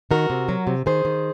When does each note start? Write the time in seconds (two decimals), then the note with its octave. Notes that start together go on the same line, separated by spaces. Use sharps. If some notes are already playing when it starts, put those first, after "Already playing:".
0.11 D#3 F#4 A#4
0.30 C3
0.49 F#3
0.67 C3
0.86 D#3 G#4 C5
1.05 D#3